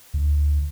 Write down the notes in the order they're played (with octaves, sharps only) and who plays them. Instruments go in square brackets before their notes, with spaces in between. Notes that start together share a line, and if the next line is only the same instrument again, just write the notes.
[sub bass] D2